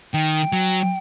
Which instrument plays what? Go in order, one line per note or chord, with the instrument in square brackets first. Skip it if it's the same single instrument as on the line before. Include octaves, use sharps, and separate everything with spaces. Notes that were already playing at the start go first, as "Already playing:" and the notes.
[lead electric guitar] D#3 [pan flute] G5
[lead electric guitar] F#3